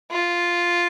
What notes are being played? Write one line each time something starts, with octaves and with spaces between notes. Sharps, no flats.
F4